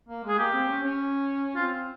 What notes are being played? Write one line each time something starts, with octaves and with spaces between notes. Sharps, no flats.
A#3
G#3 G#4
A#3 G4
C4
C#4
C#4
C4 F4